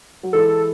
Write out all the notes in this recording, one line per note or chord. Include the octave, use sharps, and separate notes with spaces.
F#3
E3 G#3 A4